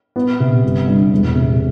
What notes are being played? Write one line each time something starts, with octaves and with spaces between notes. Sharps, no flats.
B3
C3
G1
G2
E1
C3